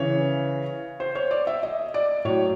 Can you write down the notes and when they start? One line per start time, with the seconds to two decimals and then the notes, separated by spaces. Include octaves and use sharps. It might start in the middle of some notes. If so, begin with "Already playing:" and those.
Already playing: C#3 E3 C#5
1.00 C5
1.15 C#5
1.31 D5
1.47 E5
1.63 D#5
1.94 D5
2.25 A2 F#3 C#5